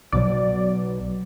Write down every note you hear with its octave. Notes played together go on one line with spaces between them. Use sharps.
B1 B2 F#3 D5